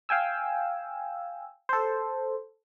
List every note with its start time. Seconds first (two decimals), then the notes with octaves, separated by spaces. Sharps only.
0.09 F5 G5 G#5 E6
1.69 A4 C5